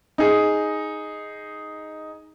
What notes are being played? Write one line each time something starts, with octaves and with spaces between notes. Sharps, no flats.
D#4 G#4